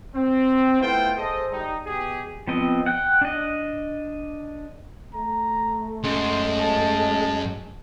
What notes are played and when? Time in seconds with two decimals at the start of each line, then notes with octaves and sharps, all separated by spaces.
0.15 C4
0.81 A3 B3 E4 F4 C5 G5
1.17 G#4 A4 C5 D#5
1.52 G3 D#4
1.86 B2 G4 G#4
2.47 F3 B3 C4 D#5
2.86 F#5 G5
3.21 D4 D#5
5.14 A3 A#5
6.04 F#2 G#3 C6
6.60 A5